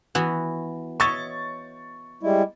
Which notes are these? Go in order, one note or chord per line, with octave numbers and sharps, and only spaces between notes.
E3 B3 F#4
C#5 D#5 E5 C#6 A6
G3 G#3 E4